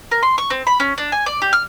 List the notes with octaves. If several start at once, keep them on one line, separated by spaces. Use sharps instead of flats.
A#4
C6
C#6
C4
B5
C#4
D4
G#5
D5
G4
F6